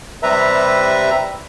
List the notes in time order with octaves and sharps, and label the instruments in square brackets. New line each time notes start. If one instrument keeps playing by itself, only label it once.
[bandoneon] C3 G3 B4 E5 A#5